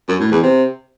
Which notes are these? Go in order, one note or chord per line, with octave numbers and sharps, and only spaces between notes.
F#2
A2
E2
C3